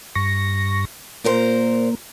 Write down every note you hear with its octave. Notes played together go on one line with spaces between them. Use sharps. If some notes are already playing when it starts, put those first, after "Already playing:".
G2 C#6 A#6
A#2 A#3 A#4 C5